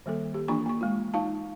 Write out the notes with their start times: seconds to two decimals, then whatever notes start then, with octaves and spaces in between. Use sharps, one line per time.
0.06 D#3 G3 A#3 A4
0.34 G4
0.48 E3 A#3 D4 F4 A#5 C#6
0.66 A#3 C#6
0.81 G#3 F4
1.14 D#4 F4 F5 A5